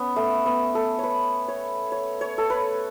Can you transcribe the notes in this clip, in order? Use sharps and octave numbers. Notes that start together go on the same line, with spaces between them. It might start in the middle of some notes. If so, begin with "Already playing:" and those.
Already playing: B3 C#4
A3
B3
A4
B4 C#5
C#5
C#5
C#5
A4
B4